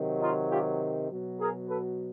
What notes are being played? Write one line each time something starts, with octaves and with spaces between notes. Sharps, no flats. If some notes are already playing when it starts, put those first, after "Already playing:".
Already playing: C3 D#3 F#3
D#4 F4
F4 G4
B2 F#3
G#4 A#4
A4 B4